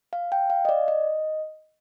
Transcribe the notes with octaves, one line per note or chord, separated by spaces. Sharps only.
F5
G5
F5
D#5
D5
D#5